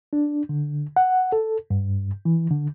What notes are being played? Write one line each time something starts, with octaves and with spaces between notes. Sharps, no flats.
D4
D3
F#5
A4
G2
E3
D3